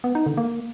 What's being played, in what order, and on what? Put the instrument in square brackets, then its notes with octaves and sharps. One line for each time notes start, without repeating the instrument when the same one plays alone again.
[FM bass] B3
D#4
D3
A#3